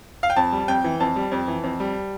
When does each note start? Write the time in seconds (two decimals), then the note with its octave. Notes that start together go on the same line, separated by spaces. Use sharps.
0.23 F5
0.30 G5
0.36 F2 A5
0.53 G3
0.68 F2 G5
0.84 E3
1.00 F2 A5
1.16 G3
1.32 F2
1.48 E3
1.63 F2
1.80 G3